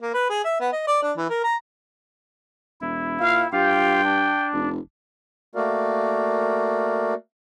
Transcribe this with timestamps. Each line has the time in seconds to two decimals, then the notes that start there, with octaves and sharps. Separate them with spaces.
0.02 A#3
0.14 B4
0.30 G#4
0.45 E5
0.60 B3
0.73 D#5
0.87 D5
1.02 D4
1.17 E3
1.29 A#4
1.44 A#5
2.81 E1 E4
3.20 A#2 F5
3.52 G2 F4 G4 F5 G5
4.04 D4
4.53 F1
5.55 A3 A#3 F#4 A#4 D5 F5